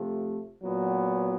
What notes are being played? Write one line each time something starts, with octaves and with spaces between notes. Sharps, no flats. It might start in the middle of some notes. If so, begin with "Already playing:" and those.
Already playing: C3 F3 A3
A#2 F#3 B3